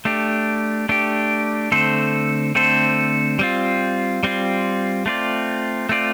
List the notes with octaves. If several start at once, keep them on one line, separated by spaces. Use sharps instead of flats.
A3 D4 G4
A3 D4 G4
D3 A3 C4 A4 C5
D3 A3 C4 A4 C5
G3 C4 F4
G3 C4 F4
A3 C4 F4 D5
A3 C4 F4 D5